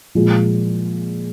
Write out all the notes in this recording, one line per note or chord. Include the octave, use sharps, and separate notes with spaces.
A#2 F3 G#3